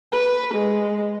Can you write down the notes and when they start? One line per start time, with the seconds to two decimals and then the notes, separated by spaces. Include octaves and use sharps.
0.12 B4
0.54 G#3